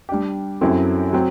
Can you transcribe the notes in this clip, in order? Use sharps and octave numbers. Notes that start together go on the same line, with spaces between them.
G3 D4 G4
F#2 F#3 C4 E4 A4
F#3 C4